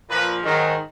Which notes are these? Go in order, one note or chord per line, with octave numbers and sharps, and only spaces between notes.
A#2 F3 B4
G#2 D#3 F#3